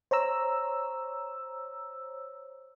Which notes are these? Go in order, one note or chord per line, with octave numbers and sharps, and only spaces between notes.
C5 C#5 A#5 E6